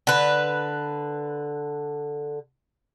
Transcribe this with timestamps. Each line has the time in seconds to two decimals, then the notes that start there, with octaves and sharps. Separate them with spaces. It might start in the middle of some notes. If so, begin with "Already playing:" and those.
0.07 D3 B4